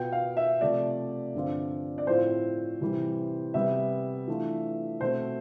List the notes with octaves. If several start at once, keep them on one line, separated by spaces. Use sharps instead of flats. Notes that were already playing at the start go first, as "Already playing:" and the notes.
Already playing: B2 B3 F4 G5
F5
E5
C3 F3 A3 D5
G2 D3 F3 C4 F4
D5
A2 F3 C4 F4 C5
C3 E3 G3
C3 G3 B3 E5
E3 A3 D4 F4
B2 A3 C4 C5